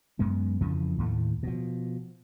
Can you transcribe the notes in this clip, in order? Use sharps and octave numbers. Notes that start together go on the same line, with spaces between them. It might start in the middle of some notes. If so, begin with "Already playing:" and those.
F#2 G#3 B3
F2 C#3 E3 F3
D#2 A2 G3 A3
B2 F3